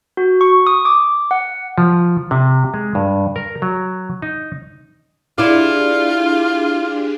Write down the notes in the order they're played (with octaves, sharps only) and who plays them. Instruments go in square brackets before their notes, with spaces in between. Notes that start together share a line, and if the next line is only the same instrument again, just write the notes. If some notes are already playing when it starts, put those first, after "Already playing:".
[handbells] F#4
C#6
D#6
D6
F#5
[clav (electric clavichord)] F3
C3
G#3
G2
A#4
F#3
D#4
[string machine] D4 G4 G#4 [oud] E4 D5 [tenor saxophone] F4